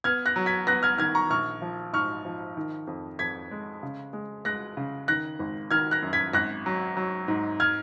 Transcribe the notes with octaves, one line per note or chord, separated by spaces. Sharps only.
B3 F6 G#6
F#6 A#6
F#3
G#6 B6
B3 F#6 A#6
F6 G#6
D#3 F6 G#6
A#5 C#6
A#1 C#6 F6
F3
G#2 C#6 F6
F3
D#3
F2
F2 G#6 B6
G#3
C#3
G#3
G#3 F#6 A#6
C#3
D#3 F#6 A#6
G#1
D#3 F6 G#6
F#6 A#6
F#2
G#6 B6
G#1 F#6 A#6
F#3
F#3
G#2
F6 G#6